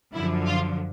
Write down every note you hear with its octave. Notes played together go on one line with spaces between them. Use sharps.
F#2 D3 F3 E4
F4